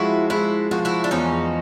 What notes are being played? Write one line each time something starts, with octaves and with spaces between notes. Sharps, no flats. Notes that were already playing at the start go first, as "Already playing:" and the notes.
Already playing: F3 G#3 E4 F#4
G#3 E4 F#4
F3 F#4
E4 F#4
D4
E2 C#4 D#4